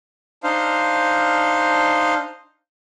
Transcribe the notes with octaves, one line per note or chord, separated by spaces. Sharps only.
D4 D#4 C5 F5